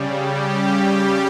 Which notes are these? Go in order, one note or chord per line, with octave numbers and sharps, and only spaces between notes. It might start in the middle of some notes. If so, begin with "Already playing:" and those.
Already playing: C#3 G3
G4
C#3 G3